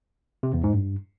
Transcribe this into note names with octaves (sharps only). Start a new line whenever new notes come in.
C3
E2
G#2
G2